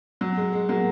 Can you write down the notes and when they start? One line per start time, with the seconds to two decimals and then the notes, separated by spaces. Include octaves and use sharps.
0.21 F#3
0.37 G#3
0.53 G#3
0.69 F#3 A#3